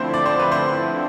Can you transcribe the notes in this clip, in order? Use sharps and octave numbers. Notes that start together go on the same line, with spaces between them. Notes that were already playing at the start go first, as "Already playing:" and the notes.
Already playing: D3 F3 A3 C4 E4 C5
D5
C5
B4
C5